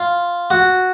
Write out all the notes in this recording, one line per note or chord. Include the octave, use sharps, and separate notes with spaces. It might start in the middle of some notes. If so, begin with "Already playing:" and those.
Already playing: F4
F#4